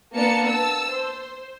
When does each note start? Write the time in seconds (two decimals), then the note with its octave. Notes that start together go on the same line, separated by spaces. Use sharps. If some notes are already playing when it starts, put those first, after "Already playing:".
0.14 A#3 B3 D4 A5 C#7
0.48 A5 E6
0.90 C5